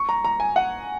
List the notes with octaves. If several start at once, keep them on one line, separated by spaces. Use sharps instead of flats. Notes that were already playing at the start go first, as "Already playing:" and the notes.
Already playing: C#6
A#5
A#5
G#5
F#5